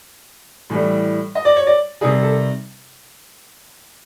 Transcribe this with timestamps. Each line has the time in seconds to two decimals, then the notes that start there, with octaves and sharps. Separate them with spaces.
0.70 A2 E3 G3
1.35 D#5
1.45 D5
1.56 C#5
1.67 D5
2.01 C3 D#3 G3 G#4
2.22 A4